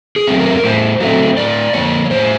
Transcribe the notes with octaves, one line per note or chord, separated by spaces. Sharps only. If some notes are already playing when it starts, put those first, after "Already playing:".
G#4
F#3 A3 C4
A#4
A2 C5
F#3 A3 C4
A2 D5
F3 A#3 C#5
A2 C5